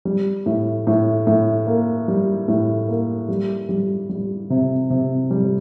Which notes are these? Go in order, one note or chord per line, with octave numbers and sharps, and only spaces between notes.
G3
A2
A2
A2
A#3
G3
A2
A#3
G3
G3
G3
C3
C3
G3